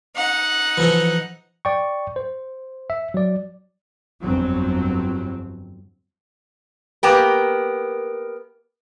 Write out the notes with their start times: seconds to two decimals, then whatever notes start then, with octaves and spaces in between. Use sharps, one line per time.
0.16 D#4 F#5
0.78 E3 F3 A4
1.65 D5 G5 C#6
2.16 C5
2.90 E5
3.14 F#3 D5
4.22 G1 F2 F#3 C4
7.03 A#3 B3 G4 A#4